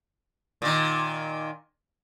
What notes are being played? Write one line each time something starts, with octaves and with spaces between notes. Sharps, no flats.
A#2 D#3